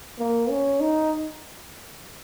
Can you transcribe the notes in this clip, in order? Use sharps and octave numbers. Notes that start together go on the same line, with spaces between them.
A#3
C#4
D#4